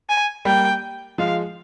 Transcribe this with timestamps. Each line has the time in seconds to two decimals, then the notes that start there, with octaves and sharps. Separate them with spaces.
0.09 G#5
0.45 G3 A#3 G5
1.18 F3 G#3 F5